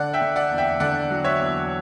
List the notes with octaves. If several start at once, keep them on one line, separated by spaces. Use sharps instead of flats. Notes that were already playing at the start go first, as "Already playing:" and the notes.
Already playing: D3 D5 F#5
E5 G5
D3
D5 F#5
E2
E5 G5
D3 D5 F#5
F#3
C#5 E5
E2